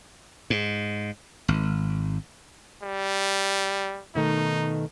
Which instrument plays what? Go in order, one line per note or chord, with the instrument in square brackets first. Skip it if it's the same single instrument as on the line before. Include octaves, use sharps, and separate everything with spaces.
[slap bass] G#2
G#1
[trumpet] G3
[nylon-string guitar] B2 D#3 A3 [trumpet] D#4